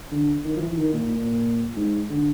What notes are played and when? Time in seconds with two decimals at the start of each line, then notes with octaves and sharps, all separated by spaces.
0.11 D3
0.45 D#3
0.56 F3
0.60 E3
0.77 D#3
0.93 A#2
1.10 A#2
1.76 G#2
2.10 D3